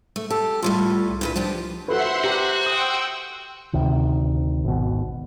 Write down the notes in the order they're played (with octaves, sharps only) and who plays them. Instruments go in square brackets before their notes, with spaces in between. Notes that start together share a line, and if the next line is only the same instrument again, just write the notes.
[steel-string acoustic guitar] A3
[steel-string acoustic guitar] G4 [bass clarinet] A4
[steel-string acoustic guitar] A2 G3 A3 [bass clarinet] F4
[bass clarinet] C2
[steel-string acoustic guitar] G2 A#2 B4
F3 D4 G4
[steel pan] F#4 A4 B4 [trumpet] C5 [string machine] E5 F#5 C6
[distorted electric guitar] F#4 [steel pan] G4 A#5 [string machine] F#6
[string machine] G5 E6 [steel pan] D#6
[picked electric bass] D2 C3 D#3
G#1 B2